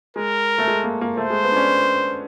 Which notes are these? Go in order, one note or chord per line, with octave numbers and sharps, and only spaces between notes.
G#3 A#4
A3
G#3
A#3
A#3
A3 C5
G#3
B3
D4
C#4